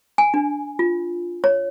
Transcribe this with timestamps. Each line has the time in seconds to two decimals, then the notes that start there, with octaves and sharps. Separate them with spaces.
0.18 G#5
0.34 D4
0.79 F4
1.44 C#5